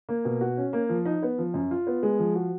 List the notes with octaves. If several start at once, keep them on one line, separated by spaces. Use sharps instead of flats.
A#3
B2
F#4
C#4
A#3
F3
D#4
B3
F3
F#2
F4
B3
G#3
F3
F#4